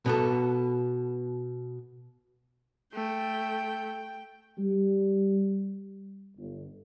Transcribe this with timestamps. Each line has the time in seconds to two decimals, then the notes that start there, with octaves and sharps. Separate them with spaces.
0.06 B2 B3 A4
2.94 A3 G5
4.58 G3
6.37 G1